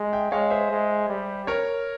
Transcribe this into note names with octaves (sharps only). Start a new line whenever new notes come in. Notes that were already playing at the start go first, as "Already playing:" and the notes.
Already playing: G#3
E5 G5
G#3 C#5 F5
C5 E5
G#3
G3
A#4 C#5